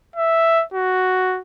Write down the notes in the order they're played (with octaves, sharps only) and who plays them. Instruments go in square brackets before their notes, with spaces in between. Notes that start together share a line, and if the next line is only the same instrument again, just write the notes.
[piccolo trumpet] E5
F#4